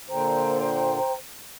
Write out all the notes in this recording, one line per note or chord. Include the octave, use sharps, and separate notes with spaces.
A#2 D3 C5 G5 A#5